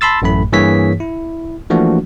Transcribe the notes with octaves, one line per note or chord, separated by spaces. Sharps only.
A5 B5 C6 E6 A6
A1 F#2 A2 A3 B5
G2 E3 A#3 G#4 C#5 B6
E4
E3 F3 A3 A#3 D4 F#4